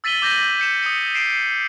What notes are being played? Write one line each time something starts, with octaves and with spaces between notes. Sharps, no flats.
E6 A6 B6 D#7 F#7 G7
D6 G6 A#6 B6 D#7
G6 C#7 E7
D#6 C#7
C7 D7 E7